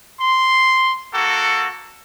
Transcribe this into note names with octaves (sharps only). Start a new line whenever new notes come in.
C6
A#3 F#4 A4